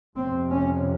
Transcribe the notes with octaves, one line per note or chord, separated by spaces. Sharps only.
F2 C3 C4
C#4